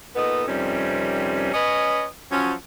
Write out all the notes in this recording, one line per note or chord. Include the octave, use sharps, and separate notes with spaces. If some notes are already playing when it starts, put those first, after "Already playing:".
A#2 B3 D#4 A4 D#5
F2 C3 D#3 G3 C#4
C#4 B4 C#5 D#5
F3 F#3 C#4